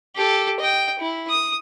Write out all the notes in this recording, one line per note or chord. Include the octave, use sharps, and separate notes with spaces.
G4 A4
D#5 G5
E4
D#6